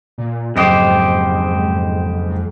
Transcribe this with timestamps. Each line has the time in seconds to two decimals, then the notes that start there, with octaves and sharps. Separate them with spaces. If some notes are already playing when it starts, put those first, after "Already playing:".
0.18 A#2
0.56 F#1 F2 G#2 G4 C5 D#5 D#6